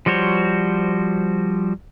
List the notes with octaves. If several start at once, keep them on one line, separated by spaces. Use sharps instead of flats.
F3 G3 F#4 C5 C#5